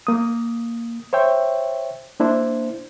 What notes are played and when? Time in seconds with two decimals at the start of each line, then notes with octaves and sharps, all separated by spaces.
0.07 A#3 D#6
1.13 C5 C#5 E5 G5
2.20 A#3 D4 E4 C5